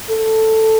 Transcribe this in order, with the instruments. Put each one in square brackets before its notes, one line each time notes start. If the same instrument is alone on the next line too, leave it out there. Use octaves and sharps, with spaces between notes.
[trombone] A4